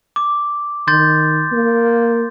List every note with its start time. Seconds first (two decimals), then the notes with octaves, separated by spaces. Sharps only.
0.16 D6
0.87 D#3 C6 G6 A6
1.52 A#3